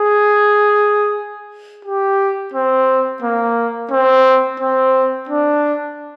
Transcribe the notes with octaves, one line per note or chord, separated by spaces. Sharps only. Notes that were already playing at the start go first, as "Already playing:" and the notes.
Already playing: G#4
G4
C4
A#3
C4
C4
D4